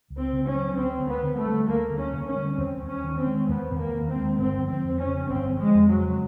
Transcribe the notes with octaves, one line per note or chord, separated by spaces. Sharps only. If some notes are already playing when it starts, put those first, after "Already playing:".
C#2
C4
C#3
C#4
F#3
D2 C4
D2
B3
D3
A3
G3
D2 A#3
D2
C#4
D3
C#4
G3
D#2 C4
D#2
C#4
D#3
C4
G#3
D#2 B3
D#2
A#3
D#3
C4
G#3
G1 C4
F3
C4
F2
C#4
C#3
G1 C4
F3
G#3
F2
F#3
C#3